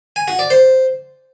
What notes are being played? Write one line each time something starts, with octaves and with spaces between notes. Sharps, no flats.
G#5
F#4
D5
C5